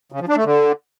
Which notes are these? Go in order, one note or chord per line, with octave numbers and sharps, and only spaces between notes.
C#3
F3
D4
A3
D3